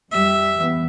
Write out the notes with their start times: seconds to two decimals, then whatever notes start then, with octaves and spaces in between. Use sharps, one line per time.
0.11 F2 G3 E5
0.56 E2 E3 B3